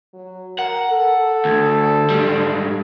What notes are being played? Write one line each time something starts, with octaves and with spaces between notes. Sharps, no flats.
F#3
A#4 F#5
A4
D2
G#2 G3